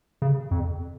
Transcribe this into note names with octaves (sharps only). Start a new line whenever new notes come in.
C#3
F2